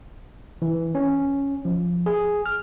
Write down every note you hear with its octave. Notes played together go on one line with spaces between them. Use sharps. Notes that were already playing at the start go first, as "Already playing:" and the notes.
E3
C#4
F3
G#4
F6